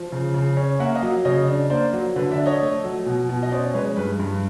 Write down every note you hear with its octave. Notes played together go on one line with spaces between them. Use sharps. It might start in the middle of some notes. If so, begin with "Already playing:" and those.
Already playing: F3
C#3
C#3
C#4
A#3 E5 F#5
D#5 F5
F#3
C#3 C#5 D#5
D4
A#3 C5 D5
F#3
D3 B4
D5 E5
D4
C#5 D#5
A3
F#3
B2
B2
D#5
C#4 C5 D5
G#3 B4 C#5
G2 B4
G2